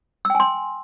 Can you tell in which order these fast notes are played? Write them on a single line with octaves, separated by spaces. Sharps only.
E6 G5 G#5 C6